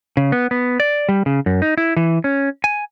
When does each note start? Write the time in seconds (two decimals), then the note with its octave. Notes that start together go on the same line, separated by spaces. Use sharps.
0.17 C#3
0.32 B3
0.51 B3
0.80 D5
1.09 G3
1.26 C#3
1.46 F#2
1.62 D#4
1.78 E4
1.96 E3
2.24 C#4
2.64 G#5